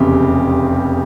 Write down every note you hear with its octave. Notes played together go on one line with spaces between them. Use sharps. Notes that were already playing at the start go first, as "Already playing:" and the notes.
Already playing: F1 E2 C#3 G4